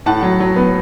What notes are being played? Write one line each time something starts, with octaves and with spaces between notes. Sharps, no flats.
A2 F#5 A5
F#3
F#3
B3